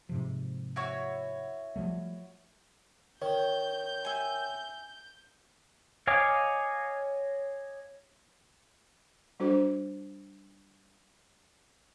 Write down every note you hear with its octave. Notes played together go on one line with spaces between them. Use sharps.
G#2 C3 F3
E4 F#4 C#5
F3 G3 A3
D#3 C#5 G6
E5 G#5
C#5 D#5 F5 G#5 D6
G3 D4 F#4 A4 C5